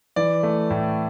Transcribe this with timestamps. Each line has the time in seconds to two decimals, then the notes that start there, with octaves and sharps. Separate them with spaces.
0.16 E3 D5
0.43 A3
0.70 A2